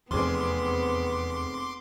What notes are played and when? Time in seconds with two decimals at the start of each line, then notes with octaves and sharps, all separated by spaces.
0.11 F1 E2 B3 C4 G#4 C6 D6